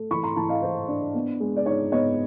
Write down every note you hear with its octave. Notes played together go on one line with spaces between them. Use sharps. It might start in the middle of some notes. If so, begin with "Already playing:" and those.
Already playing: A3
E3 B5 C#6
A#5 C6
E3 A5 B5
D#5 F5
E3 C5
D4
B3
G#3
D5
D#4 C#5
B3 C#5 D#5